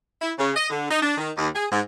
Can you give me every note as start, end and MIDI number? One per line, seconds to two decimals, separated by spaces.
0.21 0.32 64
0.38 0.51 49
0.56 0.67 75
0.70 0.89 50
0.90 1.02 63
1.02 1.17 62
1.17 1.31 51
1.37 1.48 39
1.55 1.66 68
1.72 1.81 44